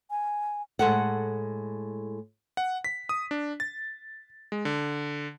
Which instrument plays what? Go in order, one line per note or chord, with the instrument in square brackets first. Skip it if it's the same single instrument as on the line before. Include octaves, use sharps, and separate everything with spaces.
[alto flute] G#5
[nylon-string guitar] A2 G#3 A4 F#5
[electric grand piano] F#5
B6
D#6
D4
A6
G#3
D3